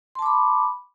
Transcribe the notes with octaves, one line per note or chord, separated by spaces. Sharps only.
A5 B5 C6 D6